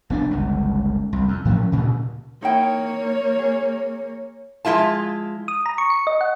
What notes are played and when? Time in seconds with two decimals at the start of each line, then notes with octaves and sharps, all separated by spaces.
0.10 F1 B3 D4
0.31 G1 C#2
1.13 C2
1.28 F2
1.45 A2 F3 F#3 C#4
1.72 D2 A#2 C#3
2.42 A#3 D#4 E4 C#5 G5
3.39 G#4
4.65 F3 G#3 E4 F4 A5
5.48 D#6
5.66 A#5
5.78 C#6
5.90 C#7
6.07 D#5
6.21 F#5